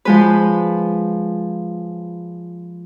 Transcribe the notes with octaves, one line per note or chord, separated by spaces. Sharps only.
F3 G#3 B4